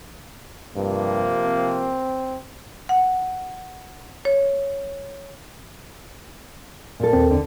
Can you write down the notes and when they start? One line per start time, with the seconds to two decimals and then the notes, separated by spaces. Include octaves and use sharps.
0.76 G2 C3 F3 A#3
1.45 C4
2.89 F#5
4.25 C#5
7.00 A#2 A4
7.13 D#2 C4
7.31 D3